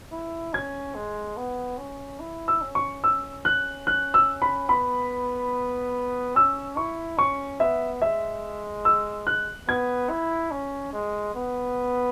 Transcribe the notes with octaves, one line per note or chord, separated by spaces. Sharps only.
E4
C#4 G#6
G#3
B3
C#4
E4
E6
C#4
C#6
E6
F#6
F#6
E6
B5
B3 B5
C#4 E6
E4 C#6
C#4 C#6
B3 E5
G#3 E5
E6
F#6
B3 G#6
E4
C#4
G#3
B3